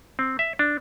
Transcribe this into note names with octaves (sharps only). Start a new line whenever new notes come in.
C4
E5
D4